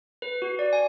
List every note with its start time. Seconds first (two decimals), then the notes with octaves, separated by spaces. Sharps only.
0.22 B4
0.42 F#4
0.59 D5
0.73 G#5